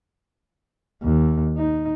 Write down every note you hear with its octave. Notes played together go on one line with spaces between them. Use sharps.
D#2
D#4